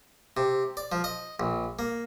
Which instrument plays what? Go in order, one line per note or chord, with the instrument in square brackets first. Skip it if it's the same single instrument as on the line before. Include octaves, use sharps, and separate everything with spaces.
[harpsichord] C3
D5
F3
D#5
A#1
A#3